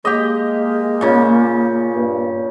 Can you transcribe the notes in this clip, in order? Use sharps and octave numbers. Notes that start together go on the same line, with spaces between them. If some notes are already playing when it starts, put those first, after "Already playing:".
G#3 A#3 G4 D#5
A#2 C#3
G2